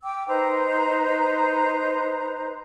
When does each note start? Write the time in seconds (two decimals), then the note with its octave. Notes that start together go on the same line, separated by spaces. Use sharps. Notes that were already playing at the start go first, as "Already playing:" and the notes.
0.03 G5 D6 E6
0.27 D#4 B4 C5 A#5